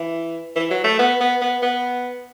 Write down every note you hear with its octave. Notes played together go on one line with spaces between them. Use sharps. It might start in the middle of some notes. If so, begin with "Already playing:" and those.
Already playing: E3
E3
F#3
A3
B3
B3
B3
B3